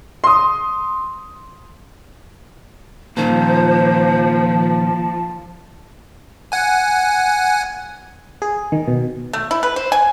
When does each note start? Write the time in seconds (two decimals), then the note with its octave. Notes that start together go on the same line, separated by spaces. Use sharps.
0.24 C6 D#6
3.17 A#2 D#3 F3 C5 A5
6.52 F#5 G#5
8.42 G#4
8.72 D#3
8.88 B2
9.33 A3
9.51 E4
9.63 B4
9.76 C5
9.92 G#5